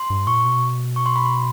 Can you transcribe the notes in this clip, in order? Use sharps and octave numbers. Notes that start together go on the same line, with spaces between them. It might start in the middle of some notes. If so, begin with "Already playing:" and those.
Already playing: C6
G2
A#2 C#6
B2
C#6
C6
B5
C6